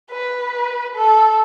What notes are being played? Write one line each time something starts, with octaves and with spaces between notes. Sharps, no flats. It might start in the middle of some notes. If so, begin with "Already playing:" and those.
B4
A4